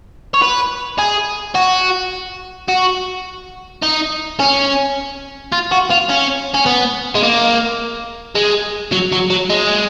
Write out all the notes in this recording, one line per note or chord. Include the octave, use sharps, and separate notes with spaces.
C#5
B4
G#4
F#4
F#4
D#4
C#4
F4
F#4
F4
C#4
C#4
B3
G#3
A#3
G#3
F#3
F#3
F#3
G#3